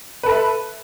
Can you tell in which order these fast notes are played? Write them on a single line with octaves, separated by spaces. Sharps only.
B4 A4 B5 E5